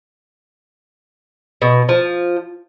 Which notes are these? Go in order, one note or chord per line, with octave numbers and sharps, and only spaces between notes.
B2
F3